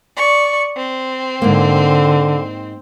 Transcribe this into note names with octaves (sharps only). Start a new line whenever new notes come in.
D5 C#6
C4
G#2 D3 A#3